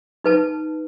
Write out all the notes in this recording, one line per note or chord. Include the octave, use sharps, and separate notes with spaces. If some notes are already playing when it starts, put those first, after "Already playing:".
D#4 B4 A5